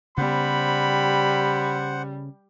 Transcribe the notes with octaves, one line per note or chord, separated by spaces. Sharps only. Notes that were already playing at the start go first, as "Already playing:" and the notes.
C#3 G3 B3 C5 F#5 B5